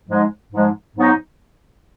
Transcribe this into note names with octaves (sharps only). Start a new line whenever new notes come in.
G#2 F3 G#3
G#2 F3 G#3
G#2 F#3 B3 D#4